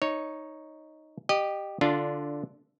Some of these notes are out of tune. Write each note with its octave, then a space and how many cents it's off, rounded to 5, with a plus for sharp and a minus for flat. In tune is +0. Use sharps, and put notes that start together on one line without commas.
D#4 +0 C#5 +0
G4 +0 D#5 -25
D3 +0 D4 -10 F4 +0